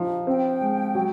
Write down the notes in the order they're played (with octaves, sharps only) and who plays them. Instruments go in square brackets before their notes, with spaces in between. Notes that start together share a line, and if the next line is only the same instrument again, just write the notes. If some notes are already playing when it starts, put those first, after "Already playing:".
Already playing: [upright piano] F3 D#4
[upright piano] C4 [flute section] G5
[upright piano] G#3
F#3